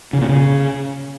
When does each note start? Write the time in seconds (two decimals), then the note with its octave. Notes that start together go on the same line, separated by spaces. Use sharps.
0.13 C#3
0.21 A#2
0.29 C#3